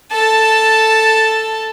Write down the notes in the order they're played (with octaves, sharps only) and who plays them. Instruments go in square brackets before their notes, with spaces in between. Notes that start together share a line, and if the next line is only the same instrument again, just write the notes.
[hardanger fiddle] A4 A5